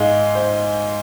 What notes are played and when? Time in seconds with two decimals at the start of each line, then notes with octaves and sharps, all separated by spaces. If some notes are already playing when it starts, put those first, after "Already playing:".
Already playing: G#2 G#3 F5
0.35 C5